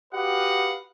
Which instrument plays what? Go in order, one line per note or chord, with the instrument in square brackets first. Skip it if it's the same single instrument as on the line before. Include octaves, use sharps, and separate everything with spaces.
[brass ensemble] F#4 G4 B4 D#5 F5 F#5